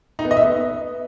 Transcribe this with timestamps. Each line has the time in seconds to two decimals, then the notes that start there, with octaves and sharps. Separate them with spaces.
0.19 D#4
0.25 B3
0.31 D#5
0.37 E5
0.43 B3